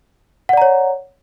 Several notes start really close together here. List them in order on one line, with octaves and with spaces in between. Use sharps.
F#5 D5 A#5 C#5